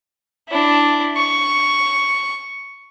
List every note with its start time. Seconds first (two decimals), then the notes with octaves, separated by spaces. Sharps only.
0.49 D4 E4
1.17 C#6